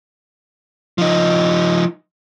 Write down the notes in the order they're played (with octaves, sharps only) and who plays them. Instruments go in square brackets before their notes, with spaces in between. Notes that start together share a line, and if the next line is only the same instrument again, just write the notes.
[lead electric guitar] F3 D#4